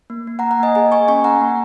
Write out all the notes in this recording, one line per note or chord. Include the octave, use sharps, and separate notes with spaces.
A#3
A#3
F#5 A#5
A#3
F#5 A#5
A#3 D#5 G#5
G#4 D#5 G#5
A#3 G#5 C#6
C#4 G#5 C#6
A#3 F#5 A#5
A#3